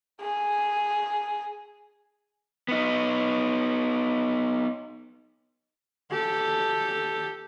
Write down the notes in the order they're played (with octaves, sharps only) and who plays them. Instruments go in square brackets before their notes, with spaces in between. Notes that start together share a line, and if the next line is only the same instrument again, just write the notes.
[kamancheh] G#4
[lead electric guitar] B3 D#4
[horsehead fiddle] G4 A4